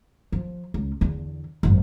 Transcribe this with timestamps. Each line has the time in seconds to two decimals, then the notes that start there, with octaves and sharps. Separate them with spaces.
0.32 F3
0.74 C#2
1.01 E2 D3
1.63 G#1 F#2